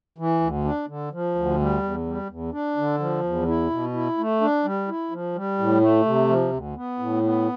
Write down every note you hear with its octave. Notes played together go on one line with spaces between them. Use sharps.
E3
D2
D4
D3
F3
D2
G3
E2
G3
E2
D4
D3
F3
E2
E4
B2
E4
A3
D4
G3
E4
F3
G3
A2
A3
C3
F3
D2
B3
A2
B3